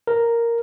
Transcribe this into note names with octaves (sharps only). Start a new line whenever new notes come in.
A#4